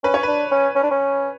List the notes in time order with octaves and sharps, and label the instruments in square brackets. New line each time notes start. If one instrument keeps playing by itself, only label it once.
[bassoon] C#4 [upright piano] B4
[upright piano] C#5
[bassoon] D4 [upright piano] B4
[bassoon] C#4
C#4
D4
C#4